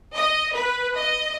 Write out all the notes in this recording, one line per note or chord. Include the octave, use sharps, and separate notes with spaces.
D#5
B4
D#5